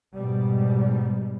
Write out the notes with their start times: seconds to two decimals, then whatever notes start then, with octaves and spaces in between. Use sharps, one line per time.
0.15 G#2 B2 G3